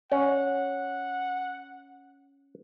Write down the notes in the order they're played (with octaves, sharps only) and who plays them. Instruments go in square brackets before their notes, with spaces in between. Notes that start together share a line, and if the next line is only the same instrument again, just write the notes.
[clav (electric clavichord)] C#4 [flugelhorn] F#5